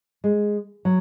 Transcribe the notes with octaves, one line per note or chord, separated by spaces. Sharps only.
G#3
F#3